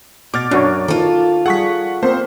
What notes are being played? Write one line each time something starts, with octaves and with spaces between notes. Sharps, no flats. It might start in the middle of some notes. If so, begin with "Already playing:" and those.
B2 D6 F6 A6
F#2 D4 F#4 C#5
D#3 F4 A4
G3 G#4 F#5 C#6 B6
A#3 C4 C5